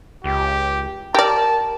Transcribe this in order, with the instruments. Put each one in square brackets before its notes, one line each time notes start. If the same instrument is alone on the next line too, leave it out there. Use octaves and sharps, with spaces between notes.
[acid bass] C#2 [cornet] G4
[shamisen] G4 D5 [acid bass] A#4 [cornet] A5